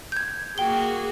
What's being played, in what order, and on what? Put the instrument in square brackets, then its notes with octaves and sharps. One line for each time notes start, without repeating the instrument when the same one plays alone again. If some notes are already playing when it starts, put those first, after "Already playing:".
[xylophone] G6 G#6
[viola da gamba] A#3 F#4 G#4 [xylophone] G5 G7